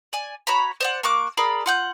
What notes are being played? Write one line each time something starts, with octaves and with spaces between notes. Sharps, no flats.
D5 G#5
F#4 C#5 A#5 B5
C5 D5 F#5
A#3 C#6 D6 F#6
G#4 A#4 D5 B5
F4 F#5 G6